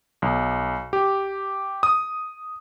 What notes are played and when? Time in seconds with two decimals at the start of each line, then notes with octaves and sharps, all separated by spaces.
0.22 B1
0.93 G4
1.83 D#6